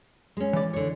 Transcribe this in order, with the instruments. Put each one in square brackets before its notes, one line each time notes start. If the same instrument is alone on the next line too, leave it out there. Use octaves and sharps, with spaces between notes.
[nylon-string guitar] G#3 C#4
[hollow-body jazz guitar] E3 D5
[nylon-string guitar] D3 C#5